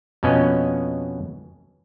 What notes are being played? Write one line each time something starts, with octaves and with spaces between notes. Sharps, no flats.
F2 B2 B3 C#4 D#5